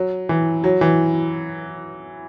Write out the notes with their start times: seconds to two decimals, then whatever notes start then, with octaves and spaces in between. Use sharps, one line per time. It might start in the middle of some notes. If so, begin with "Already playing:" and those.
Already playing: F#3
0.29 E3
0.64 F#3
0.81 E3